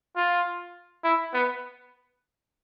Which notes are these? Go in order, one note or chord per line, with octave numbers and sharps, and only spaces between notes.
F4
E4
B3